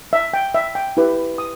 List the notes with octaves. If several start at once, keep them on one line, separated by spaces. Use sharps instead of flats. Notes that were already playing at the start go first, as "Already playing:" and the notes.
E5
G5
E5
G5
E4 G4 B4
D#6